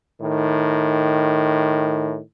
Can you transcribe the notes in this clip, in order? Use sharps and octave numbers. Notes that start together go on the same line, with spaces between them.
A2 D#3